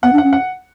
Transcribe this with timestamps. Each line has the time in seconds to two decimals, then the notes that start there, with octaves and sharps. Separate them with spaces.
0.03 B3 F#5
0.13 D4
0.18 F#5
0.23 C#4
0.33 F#5